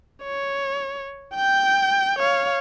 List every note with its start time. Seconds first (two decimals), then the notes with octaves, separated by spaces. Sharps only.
0.24 C#5
1.35 G5 G6
2.19 C#5 F5